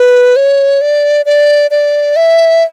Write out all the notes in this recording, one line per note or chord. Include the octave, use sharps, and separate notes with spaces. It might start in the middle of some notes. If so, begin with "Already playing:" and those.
Already playing: B4
C#5
D5
D5
D5
E5